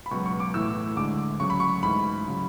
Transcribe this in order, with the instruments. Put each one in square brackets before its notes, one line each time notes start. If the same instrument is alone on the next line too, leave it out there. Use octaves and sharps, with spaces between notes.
[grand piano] B5
[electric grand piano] C#2 B2 F#3 [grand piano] C#6
[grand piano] C#6
D6
[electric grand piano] A2 E3 A3 E4 [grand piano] E6
[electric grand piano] D2 D3 G#3 [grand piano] D6
[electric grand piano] C#3 F#3 C#4 F#4 [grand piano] C#6
[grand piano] B5
C#6
[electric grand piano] G#2 E3 A3 [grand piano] B5
[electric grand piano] C#3 F#3